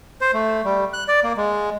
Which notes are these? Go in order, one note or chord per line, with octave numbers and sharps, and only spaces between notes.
C5
A3
G3
F#6
D5
A#3
G#3